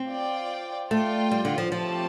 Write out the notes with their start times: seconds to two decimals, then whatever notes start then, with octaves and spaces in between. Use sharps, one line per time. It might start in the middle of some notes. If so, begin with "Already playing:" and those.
Already playing: C4
0.10 F4 D5 G5
0.91 A3 F4 D5 G5
1.31 G3
1.45 D3
1.58 F3
1.72 F3 A3 C4 G4 C5 A5